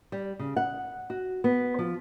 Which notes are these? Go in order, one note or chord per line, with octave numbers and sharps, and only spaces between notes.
G3
C#3
F#5
F#4
B3
F3